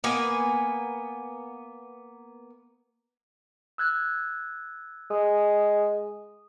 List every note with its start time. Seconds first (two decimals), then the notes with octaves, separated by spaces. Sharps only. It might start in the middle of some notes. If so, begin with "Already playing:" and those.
0.04 A#3 B3 G#5
3.78 E6 F#6 G#6
5.10 G#3 D#6